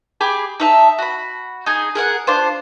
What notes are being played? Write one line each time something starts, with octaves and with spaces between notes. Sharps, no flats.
G4 G#4 B5 D6
D#4 E5 A5
F#4 B5
D#4 G#4
G#4 A#4 F#5
D4 F4 C5